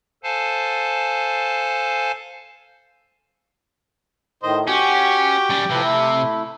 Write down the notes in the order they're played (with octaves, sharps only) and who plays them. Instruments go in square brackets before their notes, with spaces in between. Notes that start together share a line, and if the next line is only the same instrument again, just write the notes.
[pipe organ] A4 C5 F5 G#5 A5
[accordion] A2 D#3 [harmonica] C5 D#5
[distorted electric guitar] C#4 [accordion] F#4 [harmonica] G4
[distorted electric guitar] G3 C#4
[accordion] A2 F3 B4 [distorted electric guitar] C3
[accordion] A3 E4